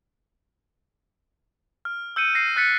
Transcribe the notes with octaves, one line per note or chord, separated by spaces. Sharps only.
F6
E6 G6 C#7 D#7
A#6 C7
F6 F#6 A6 B6 C#7